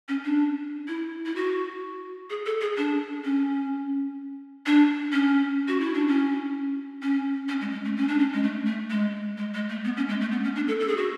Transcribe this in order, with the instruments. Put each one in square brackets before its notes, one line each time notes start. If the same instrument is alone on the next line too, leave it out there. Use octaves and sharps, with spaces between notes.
[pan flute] C#4
D4
E4
E4
F#4
G#4
A4
G#4
D4
C#4
D4
C#4
F#4
E4
D4
C#4
C#4
C#4
G#3
G#3
A3
C#4
D4
C#4
G#3
A3
A3
G#3
G#3
G#3
A3
B3
C#4
G#3
A3
B3
C#4
D4
A4
A4
G#4
F#4